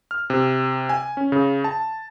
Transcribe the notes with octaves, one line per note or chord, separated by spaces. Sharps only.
F6
C3
G#5
C#4
C#3
A5